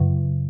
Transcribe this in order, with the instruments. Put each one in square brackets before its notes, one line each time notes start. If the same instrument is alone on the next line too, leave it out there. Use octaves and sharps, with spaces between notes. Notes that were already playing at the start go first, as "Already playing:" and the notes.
Already playing: [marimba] F#2 C#3 F#3